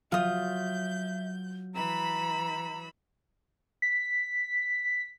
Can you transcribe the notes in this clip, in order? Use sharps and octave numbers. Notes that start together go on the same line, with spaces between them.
F#3 F4 E5 D#6 G6
E3 A#5 B5 E6
B6